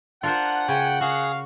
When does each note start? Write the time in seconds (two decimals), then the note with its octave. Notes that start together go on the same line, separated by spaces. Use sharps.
0.23 D4 F4 A#4 C5 F#5
0.68 C#3 G5 G#5
1.01 F#4 G#4 F5